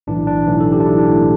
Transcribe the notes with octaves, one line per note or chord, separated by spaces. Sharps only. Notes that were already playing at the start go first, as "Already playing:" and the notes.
B1 A2 E3 D4
D4
B1 A2 E3
A4
G4
D4
B1 A2 E3 E4
D4
A3